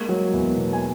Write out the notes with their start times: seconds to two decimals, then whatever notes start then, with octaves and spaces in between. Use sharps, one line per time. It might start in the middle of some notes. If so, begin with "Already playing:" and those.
Already playing: G#3 A#3
0.09 F#3
0.33 E2
0.56 B2
0.73 G#5